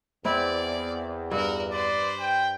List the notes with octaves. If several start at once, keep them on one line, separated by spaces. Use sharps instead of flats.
E2 C4 E4 D5 G5
G2 F#4 A#4
B4 C5 D5
G5